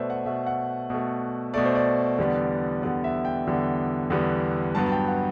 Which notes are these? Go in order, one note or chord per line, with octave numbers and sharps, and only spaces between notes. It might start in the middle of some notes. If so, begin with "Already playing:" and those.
Already playing: B2 A3 B4 C5 D5 E5
F#5
B2 A3 E5
F#5
B2 A3
B2 A3 D5
C5
D5
E2 D3 G3 B3
E2 D3 G3 B3 D5
E5
G5
E2 D3 G3 B3
E2 D3 G3 B3
G2 F#3 B3 A5
A5
G5
F#5